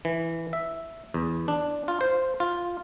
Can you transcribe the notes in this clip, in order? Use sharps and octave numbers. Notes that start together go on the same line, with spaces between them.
E3
E5
E2
D4
F4
C5
F4